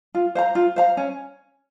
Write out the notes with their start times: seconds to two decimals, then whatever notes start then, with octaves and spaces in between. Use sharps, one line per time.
0.15 F4
0.35 C5 F5 A#5
0.55 F4
0.76 C5 F5 A#5
0.97 C#4